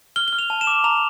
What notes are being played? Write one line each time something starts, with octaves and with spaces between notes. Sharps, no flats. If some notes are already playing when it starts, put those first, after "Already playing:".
F6 G7
F6 G7
F7
A5
E7
D6
A#5 F7